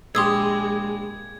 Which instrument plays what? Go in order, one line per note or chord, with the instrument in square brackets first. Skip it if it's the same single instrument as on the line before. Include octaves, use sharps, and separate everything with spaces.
[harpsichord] A#1 G4 [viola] G#3 [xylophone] C6 D#6 E6 [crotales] G#6